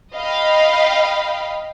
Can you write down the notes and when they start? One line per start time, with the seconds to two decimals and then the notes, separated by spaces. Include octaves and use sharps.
0.14 D#5 F5 G5 B5